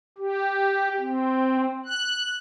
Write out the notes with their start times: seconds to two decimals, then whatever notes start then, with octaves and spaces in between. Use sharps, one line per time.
0.18 G4
1.00 C4
1.85 F#6